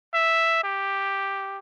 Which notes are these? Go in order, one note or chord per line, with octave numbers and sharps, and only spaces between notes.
E5
G4